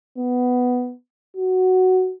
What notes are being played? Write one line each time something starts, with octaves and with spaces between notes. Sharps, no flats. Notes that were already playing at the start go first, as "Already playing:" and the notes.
B3
F#4